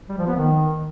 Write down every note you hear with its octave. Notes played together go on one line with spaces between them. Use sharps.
G3
F3
B3
D#3